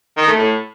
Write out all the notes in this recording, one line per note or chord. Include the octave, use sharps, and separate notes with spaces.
D#3
A3
A2